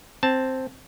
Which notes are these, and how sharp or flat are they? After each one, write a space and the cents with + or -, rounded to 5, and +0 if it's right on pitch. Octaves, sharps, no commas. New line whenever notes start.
C4 +0 A5 +0